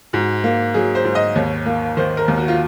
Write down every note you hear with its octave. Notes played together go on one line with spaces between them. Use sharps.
G#2 F#4
A#3
F#3 G#4
C5
G#2
D#5
D#2 C#5
A#3
D#3 C5
A#4
D#2
F#4
F4